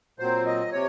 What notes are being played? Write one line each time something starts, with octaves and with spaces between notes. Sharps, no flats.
A#2 F#3 C4 C5
D#5
C3 C#5